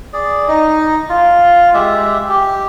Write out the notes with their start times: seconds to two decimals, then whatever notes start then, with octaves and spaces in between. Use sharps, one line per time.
0.13 G#4 D5
0.48 D#4 D#5
1.09 F4
1.74 G#3 G4 E5
2.29 G4